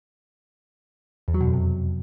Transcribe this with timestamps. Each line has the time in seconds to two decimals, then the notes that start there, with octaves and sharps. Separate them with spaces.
1.28 E2
1.34 F#3
1.41 B2
1.47 F2
1.53 C3